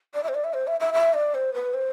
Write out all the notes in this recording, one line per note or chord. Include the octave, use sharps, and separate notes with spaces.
D5
E5
C5
D5
E5
C5
E5
E5
E5
D5
C5
B4
C5